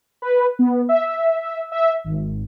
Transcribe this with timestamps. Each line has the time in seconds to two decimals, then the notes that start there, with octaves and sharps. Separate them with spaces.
0.22 B4
0.59 B3
0.89 E5
1.72 E5
2.04 G#1